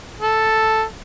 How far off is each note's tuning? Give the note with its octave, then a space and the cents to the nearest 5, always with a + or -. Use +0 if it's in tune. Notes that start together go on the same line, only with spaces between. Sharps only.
A4 +0